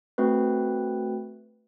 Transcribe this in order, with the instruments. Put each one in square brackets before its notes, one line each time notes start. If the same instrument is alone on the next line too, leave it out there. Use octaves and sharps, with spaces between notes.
[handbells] A3 C4 F#4 B4